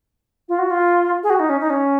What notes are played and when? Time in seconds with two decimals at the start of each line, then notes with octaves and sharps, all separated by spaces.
0.49 F4
0.59 F#4
0.70 F4
1.23 G#4
1.30 F#4
1.40 D#4
1.49 C#4
1.60 D#4
1.70 C#4